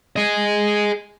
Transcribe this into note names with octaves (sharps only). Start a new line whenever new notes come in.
G#4 D#5